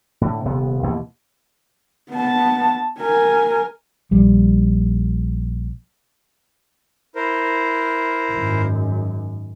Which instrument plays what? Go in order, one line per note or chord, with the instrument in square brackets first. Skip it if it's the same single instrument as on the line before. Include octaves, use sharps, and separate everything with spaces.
[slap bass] A2 D3
D#1 C3 B3
D#2 B2 E3 A#3
[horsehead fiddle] B3 A5
A#4 G#5
[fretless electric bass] A#1 G3
[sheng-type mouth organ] E4 A#4 C5
[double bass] G#1 F#2